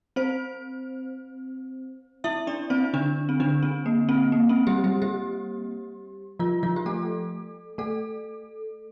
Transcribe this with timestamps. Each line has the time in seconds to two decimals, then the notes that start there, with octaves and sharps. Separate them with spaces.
0.16 C4 C5
2.24 E4 E5
2.47 D4 D5
2.70 C4 C5
2.93 D3 D4
3.29 C4
3.40 D3 D4
3.63 C4
3.86 A#3
4.09 C4
4.32 A#3
4.49 C4
4.67 G3 G4
4.84 G3 G4
5.02 G3 G4
6.39 F3 F4
6.63 F3 F4
6.76 G4
6.86 A3 A4
7.78 A3 A4